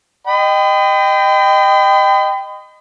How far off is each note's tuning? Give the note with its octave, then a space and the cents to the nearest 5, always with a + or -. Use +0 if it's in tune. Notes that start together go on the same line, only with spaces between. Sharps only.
D#5 -15 G5 +0 B5 +40